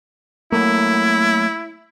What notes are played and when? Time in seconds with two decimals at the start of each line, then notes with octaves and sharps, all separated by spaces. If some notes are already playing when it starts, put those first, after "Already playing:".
0.52 F#3 A3 A#3 E4